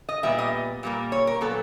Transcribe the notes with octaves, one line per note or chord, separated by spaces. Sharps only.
D#5
A#2 G3 B3 E5
D#5
A#2 G3 A#3
C#5
A#4
A#2 F#3 B3 A4